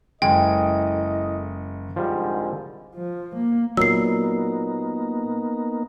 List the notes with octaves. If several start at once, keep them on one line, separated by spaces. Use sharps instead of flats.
F#1 G#3 E4 A4 D#5 G5
C2 G#2 D3 F3 G3
F3
A#3
A#2 F#3 A#3 B3 D#4 E6 C7